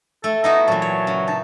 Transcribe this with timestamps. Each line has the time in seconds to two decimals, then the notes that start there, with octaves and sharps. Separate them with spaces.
0.24 A3 A4
0.44 B3 D#4 E4 F#4 D#5
0.68 A#2 E3 F#3 A5
0.82 C#5
1.07 C#3
1.28 D#4 A5